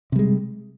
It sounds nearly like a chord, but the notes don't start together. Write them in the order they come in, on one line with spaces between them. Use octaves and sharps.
C3 G3 G#3